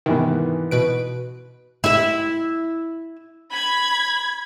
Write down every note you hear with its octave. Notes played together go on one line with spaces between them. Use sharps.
G#2 C3 D#3 E3 B3
B2 B4 D7
E4 E5
B5 G#6